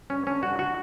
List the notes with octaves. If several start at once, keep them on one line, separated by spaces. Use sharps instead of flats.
G2 C#4
D3 C#4
G2 F#4
D3 F#4